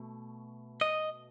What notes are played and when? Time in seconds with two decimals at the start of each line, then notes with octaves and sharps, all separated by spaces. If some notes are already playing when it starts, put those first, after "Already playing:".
Already playing: B2 A3
0.81 D#5